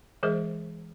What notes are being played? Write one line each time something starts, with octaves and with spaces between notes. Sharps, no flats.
E3 G#3 G#4 A#4 C5 D#5